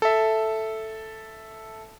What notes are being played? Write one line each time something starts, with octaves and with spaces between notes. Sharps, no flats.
A4 E5